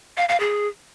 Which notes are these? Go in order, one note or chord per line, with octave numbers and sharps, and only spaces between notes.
F5
F5
G#4